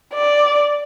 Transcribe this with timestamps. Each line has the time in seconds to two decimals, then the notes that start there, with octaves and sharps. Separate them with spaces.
0.14 D5